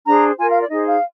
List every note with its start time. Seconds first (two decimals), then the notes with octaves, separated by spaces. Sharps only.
0.06 D4 G#4 C5 A#5
0.38 F4 A#4 G#5
0.49 F5
0.59 D5
0.69 D#4 G#4 C5 D#5
0.86 F5